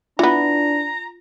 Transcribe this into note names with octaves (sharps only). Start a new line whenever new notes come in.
E3 B3 D4 F4 A#5